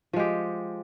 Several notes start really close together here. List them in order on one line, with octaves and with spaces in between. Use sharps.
F3 G#3 G4